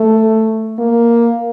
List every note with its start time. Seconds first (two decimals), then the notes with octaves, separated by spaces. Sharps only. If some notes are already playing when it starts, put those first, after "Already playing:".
Already playing: A3
0.79 A#3